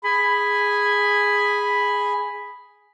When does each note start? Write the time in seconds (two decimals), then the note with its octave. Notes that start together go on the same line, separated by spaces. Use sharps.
0.04 G#4 G#5 B5